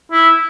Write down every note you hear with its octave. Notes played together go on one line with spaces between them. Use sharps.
E4